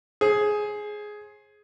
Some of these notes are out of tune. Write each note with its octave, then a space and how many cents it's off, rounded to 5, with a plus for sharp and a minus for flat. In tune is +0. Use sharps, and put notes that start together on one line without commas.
G#4 +10 C5 +40